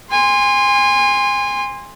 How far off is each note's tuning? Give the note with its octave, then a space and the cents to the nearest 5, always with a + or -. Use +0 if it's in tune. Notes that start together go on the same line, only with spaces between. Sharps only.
G#5 -30 C6 +0